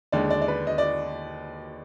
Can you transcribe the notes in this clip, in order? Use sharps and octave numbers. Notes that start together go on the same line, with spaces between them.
D#2 D3 G#3 D5
D5
D5
B4
D#5
D5